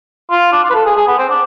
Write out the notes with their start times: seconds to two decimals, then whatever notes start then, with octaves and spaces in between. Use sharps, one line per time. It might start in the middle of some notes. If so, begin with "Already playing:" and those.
0.30 F4
0.52 D4
0.63 F4
0.70 B4
0.74 A4
0.85 G#4
0.96 G#4
1.07 B3
1.18 C4
1.29 D4